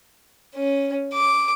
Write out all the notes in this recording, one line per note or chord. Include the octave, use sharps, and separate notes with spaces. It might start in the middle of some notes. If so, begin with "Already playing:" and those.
C#4
D6